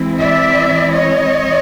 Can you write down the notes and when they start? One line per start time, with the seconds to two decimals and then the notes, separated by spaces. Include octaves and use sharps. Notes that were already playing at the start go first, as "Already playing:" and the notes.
Already playing: E3 G#3 C4 E4
0.20 D5 E5
0.93 C#5 D#5